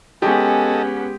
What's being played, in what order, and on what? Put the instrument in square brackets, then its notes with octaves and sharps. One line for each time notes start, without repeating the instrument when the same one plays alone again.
[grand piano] G#3 G4 [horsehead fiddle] B3 C#4 [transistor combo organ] A4 D#5 [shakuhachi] G#5